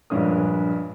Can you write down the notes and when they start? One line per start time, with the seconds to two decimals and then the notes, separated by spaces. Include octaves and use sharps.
0.10 A#1 G2 G#3 C#5 D#6